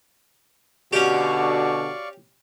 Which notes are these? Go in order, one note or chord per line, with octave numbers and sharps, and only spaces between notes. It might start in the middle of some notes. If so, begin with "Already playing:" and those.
B2 D3 C#4 F#4 G4 D5 F5 C#6